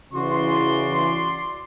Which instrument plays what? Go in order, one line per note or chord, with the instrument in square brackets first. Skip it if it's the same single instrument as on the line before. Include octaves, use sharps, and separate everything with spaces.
[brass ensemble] C#3 E3 [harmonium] F#4 [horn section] D5 C6